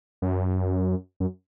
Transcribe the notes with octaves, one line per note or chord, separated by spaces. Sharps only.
F#2
F#2